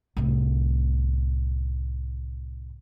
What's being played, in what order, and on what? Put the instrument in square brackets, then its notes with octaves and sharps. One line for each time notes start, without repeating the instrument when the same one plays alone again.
[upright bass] C2 A2